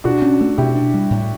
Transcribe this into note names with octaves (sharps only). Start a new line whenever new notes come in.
B2 D4 F#4
C#4
A3
B2 E4 G4
D4
G3
A2